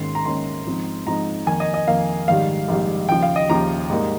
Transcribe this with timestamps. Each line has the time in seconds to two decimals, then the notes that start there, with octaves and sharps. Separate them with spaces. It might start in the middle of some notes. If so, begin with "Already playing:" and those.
Already playing: G#1 G#2 D#3 A#3 C#4 C6
0.15 A#5
0.25 G#1 G#2 D#3 A#3 C#4 C6
0.66 G#2 F3 C4 D#4
1.06 G#2 F3 C4 D#4 A#5
1.47 F2 D#3 A#3 G#5
1.60 D#5
1.74 D#5
1.87 F2 D#3 A#3 F5
2.28 A#1 G#2 D#3 G3 F5
2.68 A#1 G#2 D#3 G3
3.09 D#2 C#3 F3 G5
3.23 F5
3.36 D#5
3.49 D#2 C#3 F3 A#5
3.90 G#2 G3 A#3 D#4